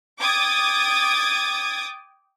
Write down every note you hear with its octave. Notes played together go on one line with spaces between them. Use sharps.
G5 D6 D#6 G#6 A6